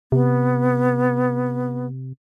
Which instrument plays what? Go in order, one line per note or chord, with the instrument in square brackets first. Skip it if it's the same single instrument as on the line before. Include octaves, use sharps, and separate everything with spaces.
[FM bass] C3 [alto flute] B3